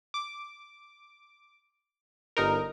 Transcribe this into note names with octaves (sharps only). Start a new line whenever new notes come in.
D6
G1 D#4 A#4